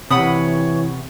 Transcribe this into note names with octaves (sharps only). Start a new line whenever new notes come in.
C3 E3 C#5 F#5 B5 D#6